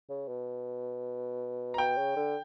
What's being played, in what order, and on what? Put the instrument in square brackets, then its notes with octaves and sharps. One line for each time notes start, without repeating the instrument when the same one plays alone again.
[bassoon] C#3
B2
[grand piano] A#5
[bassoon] B2 [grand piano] G5
[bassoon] C#3
D3